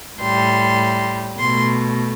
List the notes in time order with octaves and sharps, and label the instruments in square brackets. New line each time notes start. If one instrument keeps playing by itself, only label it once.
[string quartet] A2 G3 C6
B2 A3 C6